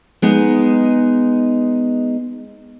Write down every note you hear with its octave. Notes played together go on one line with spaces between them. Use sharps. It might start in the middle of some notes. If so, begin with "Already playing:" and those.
G#3 B3 D#4